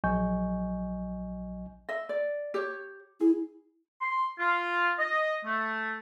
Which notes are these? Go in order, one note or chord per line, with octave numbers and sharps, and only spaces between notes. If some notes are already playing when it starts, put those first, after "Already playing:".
A#1 F#3 D#5 G#5 C#6 G6
D#5 E5
D5
G4 C#5
E4 G#4
C6
F4
D#5
A3